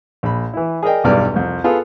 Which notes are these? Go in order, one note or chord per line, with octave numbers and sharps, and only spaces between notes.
A#1 B5
E3 E4
G#4 A#4 D5 D#5 G5
B1 E2 G2 E3 D5 F6
C2 F2
B3 F4 G#4 A4